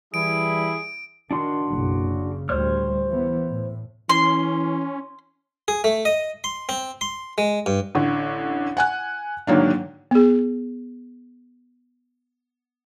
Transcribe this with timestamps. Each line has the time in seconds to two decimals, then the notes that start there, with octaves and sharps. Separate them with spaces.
0.14 E3 G3 E4 G#4 D7
1.31 D#3 D4 F#4 C6
1.72 F#1 B1
2.04 C#3
2.49 D2 A2 G3 C5 C#5 F6
3.09 E3 B3
3.49 A2
4.09 E3 C#4 C6
5.68 G#4
5.84 A3
6.05 D#5
6.44 C6
6.69 C4
7.01 C6
7.38 G#3
7.66 G2
7.95 A1 D3
8.77 F#5 G#5 F#6
9.47 G#2 D3 D#3 F#3 A#3 D4
10.11 B3 G#4